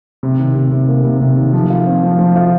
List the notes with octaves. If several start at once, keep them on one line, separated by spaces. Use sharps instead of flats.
C3
D#3
C3
C3
A#3
C3
C3
D#3
F3
F4
C4
F3
F3
F4